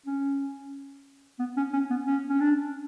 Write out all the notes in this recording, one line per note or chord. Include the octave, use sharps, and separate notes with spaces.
C#4
B3
C#4
C#4
B3
C#4
C#4
D4